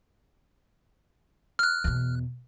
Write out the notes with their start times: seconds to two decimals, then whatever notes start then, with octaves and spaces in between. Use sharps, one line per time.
1.59 F6 F#6
1.84 E2 B2